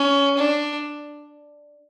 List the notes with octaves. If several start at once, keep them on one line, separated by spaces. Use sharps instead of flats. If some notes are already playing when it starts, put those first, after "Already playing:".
Already playing: C#4
D4